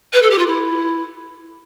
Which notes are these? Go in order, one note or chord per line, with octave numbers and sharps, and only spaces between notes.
B4
A4
G4
F4
E4